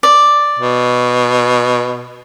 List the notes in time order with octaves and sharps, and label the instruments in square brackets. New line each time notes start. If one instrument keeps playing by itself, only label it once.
[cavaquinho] D5
[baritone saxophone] B2